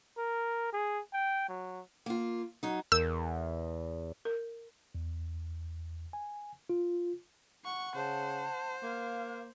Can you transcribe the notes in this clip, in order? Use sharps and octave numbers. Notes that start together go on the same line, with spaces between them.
A#4
G#4
G5
F#3
A#3 F4
F#3 D#4
E2 A#4 E6
A#4
E2
G#5
F4
F#5 C#6
C#3 C5 A5
A#3 F5